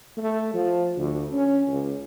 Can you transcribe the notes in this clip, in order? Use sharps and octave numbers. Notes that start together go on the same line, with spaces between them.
A3
F3
D2
C#4
C#2